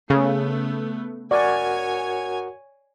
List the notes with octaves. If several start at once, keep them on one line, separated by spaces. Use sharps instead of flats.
C#3 A3 B3
F#4 A#4 C#5 D5 F#5 G#5